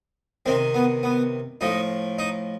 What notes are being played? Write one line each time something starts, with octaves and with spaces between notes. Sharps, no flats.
C3 D#3 C4
B3
B3
A2 F3 D#4
D#4